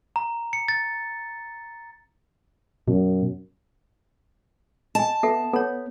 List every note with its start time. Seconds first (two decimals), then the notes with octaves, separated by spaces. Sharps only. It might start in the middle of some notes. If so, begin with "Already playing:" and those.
0.16 A#5
0.53 C#7
0.68 A6
2.88 F#2 B2
4.95 D#5 G#5 A5
5.23 B3 A4 E5 F#5
5.54 B3 A4 C#5